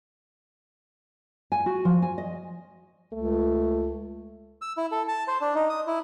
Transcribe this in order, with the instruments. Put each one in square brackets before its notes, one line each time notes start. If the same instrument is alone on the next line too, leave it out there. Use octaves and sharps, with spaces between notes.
[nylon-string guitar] G#5
F#4
F3
G#5
D#5
[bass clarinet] C#2 [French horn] A3
[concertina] E6
E4
A4
A5
C5
D4
D#4
D#6
E4